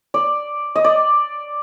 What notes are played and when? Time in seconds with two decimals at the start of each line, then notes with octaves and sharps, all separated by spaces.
0.14 D5
0.75 D#5
0.84 D5